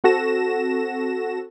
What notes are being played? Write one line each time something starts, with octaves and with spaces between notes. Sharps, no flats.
C4 F#4 A4 A#6 E7